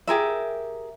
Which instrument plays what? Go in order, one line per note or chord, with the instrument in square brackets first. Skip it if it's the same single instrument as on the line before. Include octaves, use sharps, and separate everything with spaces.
[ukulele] G4 G#4 A#4 E5